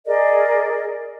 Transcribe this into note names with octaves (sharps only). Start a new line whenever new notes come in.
G#4 A#4 D5 D#5